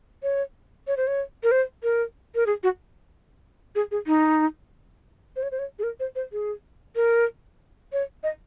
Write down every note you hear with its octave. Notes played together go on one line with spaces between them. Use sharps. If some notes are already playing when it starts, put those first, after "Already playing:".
C#5
C#5
C5
C#5
A#4
C5
A#4
A#4
G#4
F#4
G#4
G#4
D#4
C5
C#5
C5
C#5
G#4
A#4
C5
C5
G#4
A#4
C#5
D#5